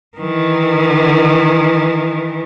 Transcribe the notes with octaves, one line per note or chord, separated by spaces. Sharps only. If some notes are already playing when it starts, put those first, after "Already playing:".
D#3 E3